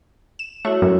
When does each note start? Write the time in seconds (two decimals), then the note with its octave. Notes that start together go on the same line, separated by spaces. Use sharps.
0.39 E7
0.65 A3 E4 F#4 C#5
0.82 F#2